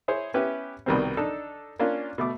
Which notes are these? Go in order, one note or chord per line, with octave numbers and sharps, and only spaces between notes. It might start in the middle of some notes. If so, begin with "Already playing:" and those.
E4 G#4 C5 C#5
B3 C#4 E4 G4 B4
C2 B2 D#3 G3 B3 C4
D4 D#4 A4
A#3 C#4 D4 F4
B2 A3 D6